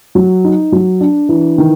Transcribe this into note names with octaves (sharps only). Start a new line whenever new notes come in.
F#3
D#4
F#3
D4
E3
D#3